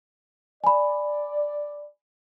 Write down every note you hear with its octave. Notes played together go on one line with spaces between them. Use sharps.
D5 G#5 B5